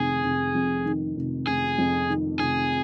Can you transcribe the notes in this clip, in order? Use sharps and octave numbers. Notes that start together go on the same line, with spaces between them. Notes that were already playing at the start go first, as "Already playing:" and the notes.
Already playing: F1 D#3 G#4
F1
F2
D#3
F1
F1 G#4
F2
D#3
F1 G#4